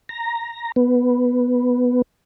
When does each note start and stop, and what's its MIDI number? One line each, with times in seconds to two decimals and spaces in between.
0.09 0.72 82
0.76 2.02 59